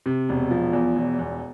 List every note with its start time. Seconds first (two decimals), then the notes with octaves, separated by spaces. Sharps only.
0.06 C3
0.29 E1
0.51 F3
0.73 E2
0.96 E1
1.19 E2